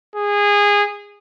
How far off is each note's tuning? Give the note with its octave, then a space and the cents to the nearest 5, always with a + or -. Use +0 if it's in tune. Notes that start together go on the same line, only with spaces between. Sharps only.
G#4 -20